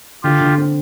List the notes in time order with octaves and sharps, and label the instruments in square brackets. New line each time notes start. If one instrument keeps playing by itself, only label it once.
[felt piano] D3 [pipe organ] F4 G4
[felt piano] D3
C4